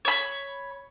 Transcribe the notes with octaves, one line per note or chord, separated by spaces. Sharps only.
C#5 B5